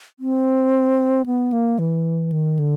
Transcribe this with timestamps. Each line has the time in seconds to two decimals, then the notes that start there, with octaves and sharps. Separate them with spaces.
0.20 C4
1.26 B3
1.53 A#3
1.79 E3
2.32 D#3
2.59 D3